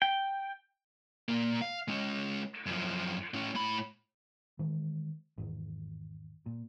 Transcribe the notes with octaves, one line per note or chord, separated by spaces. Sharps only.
G5
A#2 A#3
F5
G#3 C#4
F#2 F3
A2 C#4
A2 B5
D#3 E3 G#3
G#1 E2
A#2